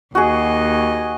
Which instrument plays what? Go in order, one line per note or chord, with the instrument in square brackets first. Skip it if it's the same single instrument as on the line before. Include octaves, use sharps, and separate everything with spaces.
[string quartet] D#2 D#5 [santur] F#4 G#4